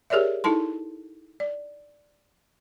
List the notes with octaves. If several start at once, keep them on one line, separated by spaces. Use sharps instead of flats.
G4 G#4 A#4 C#5 D5 E5
D#4 E4 A4 A5 C6
D5